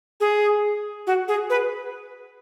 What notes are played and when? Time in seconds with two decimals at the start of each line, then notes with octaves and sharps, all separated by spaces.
0.20 G#4
1.07 F#4
1.28 G#4
1.50 B4